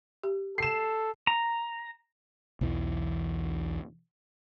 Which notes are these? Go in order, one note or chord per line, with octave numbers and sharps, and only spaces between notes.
G4
A4 C7 E7
A#5
B1 E2 E3